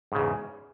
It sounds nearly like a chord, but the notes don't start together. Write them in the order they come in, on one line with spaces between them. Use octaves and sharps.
G#2 C#3 E2